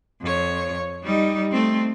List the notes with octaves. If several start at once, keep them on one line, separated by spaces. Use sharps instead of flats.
F2 C#5
G3 D#4
A3 C4